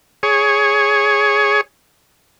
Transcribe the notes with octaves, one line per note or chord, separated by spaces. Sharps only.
G#4 C#5